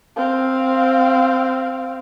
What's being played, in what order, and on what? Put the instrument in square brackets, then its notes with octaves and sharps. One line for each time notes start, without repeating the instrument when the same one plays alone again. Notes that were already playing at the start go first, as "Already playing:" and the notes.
[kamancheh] C4 F5